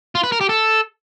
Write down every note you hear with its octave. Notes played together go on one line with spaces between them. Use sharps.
F4
B4
A#4
G4
A4